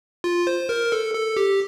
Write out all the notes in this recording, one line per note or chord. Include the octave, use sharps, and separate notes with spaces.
F4
C5
A#4
A4
A4
G4